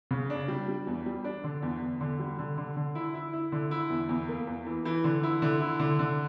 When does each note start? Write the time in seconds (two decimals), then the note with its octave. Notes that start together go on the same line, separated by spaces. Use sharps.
0.11 C#3
0.30 D4
0.48 G3
0.68 G3
0.87 E2
1.06 G3
1.24 D4
1.44 D3
1.62 E2
1.82 E2
2.01 D3
2.19 G3
2.39 D3
2.58 D3
2.76 D3
2.95 E4
3.14 E4
3.33 E4
3.52 D3
3.71 E4
3.90 E2
4.09 E2
4.28 A#3
4.47 E2
4.66 E3
4.85 E3
5.04 D3
5.23 E4
5.42 D3
5.60 E4
5.79 D3
5.99 D3